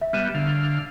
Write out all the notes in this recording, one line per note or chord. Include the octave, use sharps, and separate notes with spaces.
E5
G3 B3 F6 D#7 E7
D3 F5